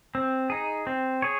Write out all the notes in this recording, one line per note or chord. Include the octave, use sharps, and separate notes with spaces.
C4
D#4 G#4
C4
G#4 C#5